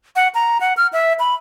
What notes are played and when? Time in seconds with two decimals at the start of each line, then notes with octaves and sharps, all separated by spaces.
0.16 F#5
0.35 A#5
0.61 F#5
0.77 F6
0.93 E5
1.19 B5